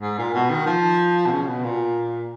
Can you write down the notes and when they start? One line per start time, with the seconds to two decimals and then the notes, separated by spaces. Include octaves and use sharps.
0.01 G#2
0.18 A#2
0.34 B2
0.50 D#3
0.66 F3
1.26 B2
1.31 C#3
1.48 B2
1.64 A#2